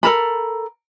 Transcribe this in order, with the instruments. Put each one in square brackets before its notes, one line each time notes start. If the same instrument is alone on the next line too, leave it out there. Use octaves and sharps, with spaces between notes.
[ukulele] A4 A#4 B5